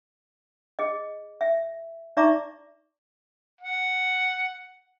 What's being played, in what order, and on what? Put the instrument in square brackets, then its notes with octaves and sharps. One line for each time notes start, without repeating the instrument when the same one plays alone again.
[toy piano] G#4 D#5
E5
D#4 D5 E5 A#5 C#6 D6
[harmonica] F#5